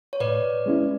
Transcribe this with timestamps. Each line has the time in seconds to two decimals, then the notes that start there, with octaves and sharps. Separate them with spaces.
0.13 C#5
0.20 A2 B4 D5
0.66 G#3 C#4 E4